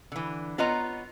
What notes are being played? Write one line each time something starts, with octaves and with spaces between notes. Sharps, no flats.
D3 E3
B3 F4 B4 C#5 D#5 A#5